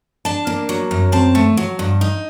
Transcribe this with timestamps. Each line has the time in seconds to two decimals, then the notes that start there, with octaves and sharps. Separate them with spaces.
0.25 D4 A5
0.47 A#3
0.69 F#3
0.91 F#2
1.12 C4 A5
1.35 A3
1.57 F#3
1.79 G2
2.01 D#4